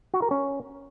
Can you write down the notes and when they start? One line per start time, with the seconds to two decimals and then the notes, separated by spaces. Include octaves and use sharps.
0.14 F#4
0.22 A#4
0.31 C#4